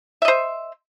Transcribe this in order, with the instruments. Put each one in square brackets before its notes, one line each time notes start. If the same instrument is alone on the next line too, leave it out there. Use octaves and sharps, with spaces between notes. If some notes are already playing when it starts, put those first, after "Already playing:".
[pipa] E5
D#5
C5